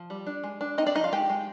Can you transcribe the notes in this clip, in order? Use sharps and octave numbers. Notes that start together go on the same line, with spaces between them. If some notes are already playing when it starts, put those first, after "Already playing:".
Already playing: F3
G3
D4
G#3
D4
C4 D#4 D#5
D4 D5
F3 D#4 D#5
F4 F5
G#3 G4 G5
G#3